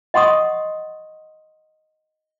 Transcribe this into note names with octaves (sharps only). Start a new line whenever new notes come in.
D#5 F#5 C6 C#6 D#6